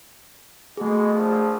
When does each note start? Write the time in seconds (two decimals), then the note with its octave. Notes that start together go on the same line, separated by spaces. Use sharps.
0.77 B2 G#3 A3 G#4
1.13 A#1 F3